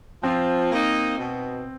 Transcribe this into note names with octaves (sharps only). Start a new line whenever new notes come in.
F3 C4
A#3 D#4
B2